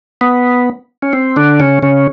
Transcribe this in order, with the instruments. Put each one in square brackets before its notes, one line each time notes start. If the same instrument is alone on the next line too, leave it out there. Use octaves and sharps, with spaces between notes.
[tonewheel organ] B3
C#4
C4
D3 D4
C#3 C#4
C#3 C#4